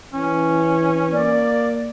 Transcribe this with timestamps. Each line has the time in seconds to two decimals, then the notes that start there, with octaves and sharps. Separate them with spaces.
0.13 E3 C#4
1.13 A#3 D5